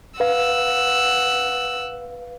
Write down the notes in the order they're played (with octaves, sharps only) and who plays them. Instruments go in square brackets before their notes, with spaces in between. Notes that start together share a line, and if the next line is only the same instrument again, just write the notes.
[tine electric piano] B4 F5 [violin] F#5 E6